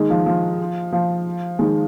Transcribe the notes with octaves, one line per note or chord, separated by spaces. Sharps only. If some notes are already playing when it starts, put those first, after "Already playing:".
Already playing: D#3 G#3
F3
F3
F3
D#3 G#3